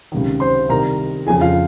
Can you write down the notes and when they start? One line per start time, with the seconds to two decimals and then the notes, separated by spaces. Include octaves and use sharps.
0.12 C#2 C3 D#3
0.40 C5 C6
0.69 C2 C3 D#3 A#4 A#5
1.27 F2 C#3 F3 G#4 G#5
1.41 F4 F5